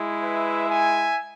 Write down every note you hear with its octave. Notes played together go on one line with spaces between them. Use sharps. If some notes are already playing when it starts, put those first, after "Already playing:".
Already playing: G#3 E4
B4 E5
E5 G#5